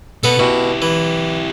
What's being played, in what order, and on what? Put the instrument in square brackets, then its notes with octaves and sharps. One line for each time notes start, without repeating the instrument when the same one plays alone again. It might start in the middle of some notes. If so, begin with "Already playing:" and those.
[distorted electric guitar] B2 [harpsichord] B3 A4
[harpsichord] B2 [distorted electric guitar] E4 G4
[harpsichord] E3